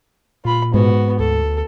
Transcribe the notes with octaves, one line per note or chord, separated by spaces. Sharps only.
A#2 F4 B5
G#2 B3 F#4
D2 A4